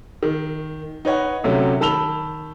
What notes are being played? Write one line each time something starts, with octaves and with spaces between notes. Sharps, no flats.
D#3
D#4 B4 C#5 F#5
D2 C3 F#3 A3 C#4
D#3 A5 B5 E6 F7 G7